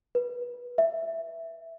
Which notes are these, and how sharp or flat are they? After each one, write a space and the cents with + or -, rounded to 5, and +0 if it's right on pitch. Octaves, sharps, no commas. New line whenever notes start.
B4 -20
E5 +5